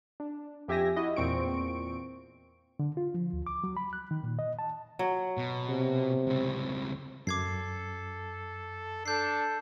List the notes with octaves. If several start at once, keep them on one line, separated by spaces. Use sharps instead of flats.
D4
F2 G4 E5 G#5 A#6
E4 F#4 D#5
E2 A#2 C4 C#6 D7
D3
F4
F3
D2
D6
F#3
B5
F#6
D#3
A#2
D#5
A5
F#3
B2
C3
C#2 C4
F#2 A4 D6 G#6 C7
D4 A4 G6 C7